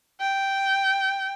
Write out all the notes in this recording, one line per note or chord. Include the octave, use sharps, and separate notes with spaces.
G5